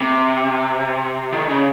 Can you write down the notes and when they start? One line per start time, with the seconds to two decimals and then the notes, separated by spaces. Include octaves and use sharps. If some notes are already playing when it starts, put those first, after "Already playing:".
0.01 C3
1.32 D#3
1.49 C#3